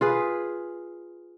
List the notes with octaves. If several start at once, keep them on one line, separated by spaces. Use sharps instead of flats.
F4 G#4 B4